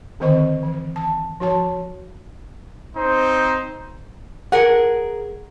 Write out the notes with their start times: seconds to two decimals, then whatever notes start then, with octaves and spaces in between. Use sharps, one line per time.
0.20 D3 D#3 C4 C5 D#5 C#6
0.63 E3
0.96 A5
1.40 F3 F#4 C#5 A5
2.95 C4 D#4 C5
4.52 G#4 A#4 F#5